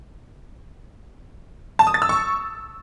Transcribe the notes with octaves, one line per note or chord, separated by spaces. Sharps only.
A5
D#6
A6
E6
C#6